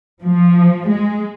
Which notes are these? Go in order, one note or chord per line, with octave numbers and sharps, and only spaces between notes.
F3
G#3